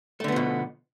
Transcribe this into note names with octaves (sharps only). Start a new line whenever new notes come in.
B2 D3 F3 A3 B3